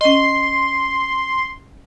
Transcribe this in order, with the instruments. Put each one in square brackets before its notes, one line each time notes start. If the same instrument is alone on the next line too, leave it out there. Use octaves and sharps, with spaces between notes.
[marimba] C#4 D#5 [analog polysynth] C6